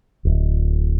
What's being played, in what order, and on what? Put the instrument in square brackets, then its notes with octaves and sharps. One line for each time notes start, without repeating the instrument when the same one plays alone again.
[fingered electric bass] D1